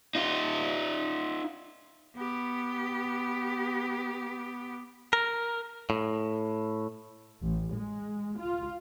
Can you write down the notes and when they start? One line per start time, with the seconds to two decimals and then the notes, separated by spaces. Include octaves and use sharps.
0.15 D#4 F4
2.16 B3 G4
5.13 A#4
5.90 A2
7.41 A1
7.72 G#3
8.38 F4